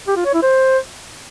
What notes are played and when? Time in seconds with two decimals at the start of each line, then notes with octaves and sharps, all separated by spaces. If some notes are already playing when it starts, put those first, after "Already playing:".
0.08 G4
0.16 F4
0.25 C#5
0.34 E4
0.43 C5